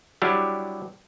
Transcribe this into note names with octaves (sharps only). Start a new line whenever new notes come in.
F#3 G3 D4 E4 G4